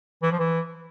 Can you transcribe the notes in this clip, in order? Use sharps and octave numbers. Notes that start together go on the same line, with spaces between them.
E3
F3
E3